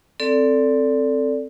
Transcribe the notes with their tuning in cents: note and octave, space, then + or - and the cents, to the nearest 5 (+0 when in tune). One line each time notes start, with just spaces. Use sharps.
C4 +0 A4 +10 D5 -15